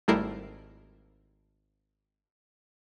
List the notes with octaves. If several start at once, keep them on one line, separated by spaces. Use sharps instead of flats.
G#1 G3 A3 E4 A#4 C7